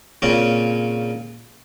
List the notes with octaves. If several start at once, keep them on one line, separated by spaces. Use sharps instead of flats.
A#2 C#3 C4 C#4